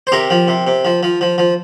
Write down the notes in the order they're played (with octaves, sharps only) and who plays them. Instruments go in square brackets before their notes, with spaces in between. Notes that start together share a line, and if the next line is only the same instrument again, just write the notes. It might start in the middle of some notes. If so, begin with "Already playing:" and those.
[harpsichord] C5
C3 G4 A#4
F3
C3
C3
F3
F3
F3
F3